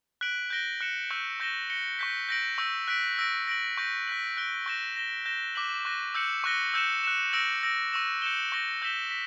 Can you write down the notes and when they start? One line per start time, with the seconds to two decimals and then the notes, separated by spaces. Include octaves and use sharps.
0.21 F#6 B6 D7 F#7
0.50 G6 A#6 D7 G7
0.81 F#6 C#7 E7
1.10 C#6 E6 G6
1.40 C#6 G6 A#6 E7 G7
1.70 A#6 C#7 G7
1.99 C#6 G6 B6
2.29 G6 A#6 D7 F#7
2.58 C#6 E6 G6
2.88 F#6 B6 D7 F#7
3.18 E6 A#6 D7
3.48 A#6 D7 F#7
3.77 C#6 G6 A#6
4.07 F#6 B6 F#7
4.37 F#6 B6 D7 G7
4.66 C#6 G6 A#6 E7
4.96 A#6 E7 G7
5.26 G6 A#6 E7 G7
5.55 D6 F#6 B6 F#7
5.85 C#6 F#6 A#6
6.15 E6 G6 C#7 F#7
6.44 C#6 F#6 A#6 C#7 G7
6.74 E6 G6 C#7 E7
7.03 F#6 C#7 E7
7.33 E6 A#6 D7 F#7
7.63 E6 A#6 D7
7.92 C#6 E6 A#6 E7
8.22 G6 C#7 E7 G7
8.52 C#6 G6 A#6 E7 G7
8.82 E6 G6 B6 E7 G7
9.11 B6